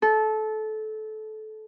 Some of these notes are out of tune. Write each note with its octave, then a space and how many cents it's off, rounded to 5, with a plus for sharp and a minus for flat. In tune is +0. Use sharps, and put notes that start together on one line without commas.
A4 -20